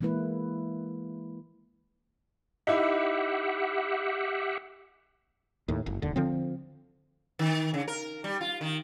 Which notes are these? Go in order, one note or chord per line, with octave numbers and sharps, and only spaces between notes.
E3 G#3 A#3 E4 B4
D#4 E4 G4 E5 F#5
D#2 A2
F#1
D#1 D#2 D3
D3 F3 C4
D#3
C#3
A#4
G3
F4
D#3